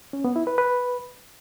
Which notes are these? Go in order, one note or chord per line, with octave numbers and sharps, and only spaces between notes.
C#4
B3
E4
B4
B4